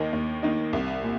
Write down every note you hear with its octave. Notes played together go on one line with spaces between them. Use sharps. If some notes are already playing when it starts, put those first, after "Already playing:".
Already playing: D#2 D#3 A#3 D#4
D#2
D#3 A#3 D#4
C2
A#2